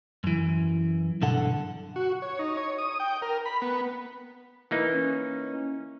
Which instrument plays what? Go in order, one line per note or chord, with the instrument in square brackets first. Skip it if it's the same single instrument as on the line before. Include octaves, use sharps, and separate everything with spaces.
[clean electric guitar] F#2 E3
B1 G2 D3 A4 F#5
[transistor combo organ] F#4
C#5
D#4
C#5
D#6
G5
A#4
B5
B3
[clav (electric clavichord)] E3 A#3 D#4
[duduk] C#4